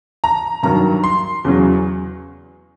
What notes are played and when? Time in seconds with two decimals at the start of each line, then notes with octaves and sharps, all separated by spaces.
0.24 A#5
0.63 G2 D#3 F#3 A#5
1.04 C6
1.45 E2 C#3 F#3